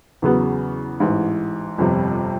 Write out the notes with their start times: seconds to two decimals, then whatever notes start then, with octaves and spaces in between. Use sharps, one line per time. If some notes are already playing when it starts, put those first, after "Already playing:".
0.22 E2 C#3 F#3 B3
1.00 A1 G#2 E3
1.78 G1 F2 C3